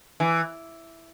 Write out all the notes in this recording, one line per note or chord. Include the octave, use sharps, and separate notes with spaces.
E3